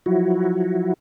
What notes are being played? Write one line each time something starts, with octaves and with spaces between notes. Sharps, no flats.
F3 F#3 E4 F#4